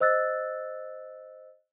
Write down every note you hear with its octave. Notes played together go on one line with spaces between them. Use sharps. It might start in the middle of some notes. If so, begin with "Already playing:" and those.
C5 D#5 E6 F#6 A6